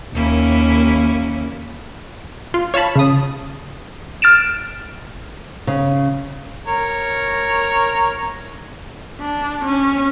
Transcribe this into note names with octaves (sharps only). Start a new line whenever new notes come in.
D#2 A#3 C#4 E4
F4
C#5 F5 A5 B5
C#3 D#6
F6 A6 D7 E7
C#3
A#4 C#5
D4
C#4